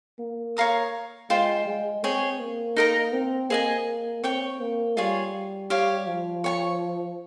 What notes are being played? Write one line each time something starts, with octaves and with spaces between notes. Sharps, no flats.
A#3
C#5 F5 A#5 D#6
G#3 F4 C5 G5
G#3
C4 G#4 C#5 G5
A#3
D#4 A#4 D#5 A#5
C4
A#3 G#4 D#5 G#5
C4 C#5 G5 C#6
A#3
G3 F4 G#4 C#5
G4 C#5 F5
F3
C#5 G#5 C#6